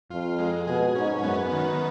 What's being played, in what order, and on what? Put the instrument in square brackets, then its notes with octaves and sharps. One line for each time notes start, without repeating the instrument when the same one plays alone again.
[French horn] F2 [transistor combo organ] F4
[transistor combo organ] G#3
[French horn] B2 [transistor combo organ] G#4
[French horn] G#2 [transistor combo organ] C#4
[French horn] F#2 [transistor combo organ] B3
[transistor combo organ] D#3